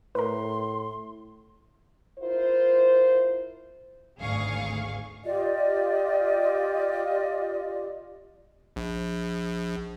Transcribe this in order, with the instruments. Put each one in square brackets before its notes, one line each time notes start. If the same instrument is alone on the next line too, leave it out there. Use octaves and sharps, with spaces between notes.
[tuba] A2 [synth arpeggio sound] A#4 B4 [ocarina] C6
[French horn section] E4 F4 A#4 C5
[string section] G#1 D2 G#4 F5 C#6
[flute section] F4 G4 D5 D#5
[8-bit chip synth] A#1